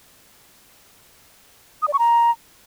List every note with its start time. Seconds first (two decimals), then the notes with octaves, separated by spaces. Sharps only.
1.82 D#6
1.88 D5
1.93 C#6
1.99 A#5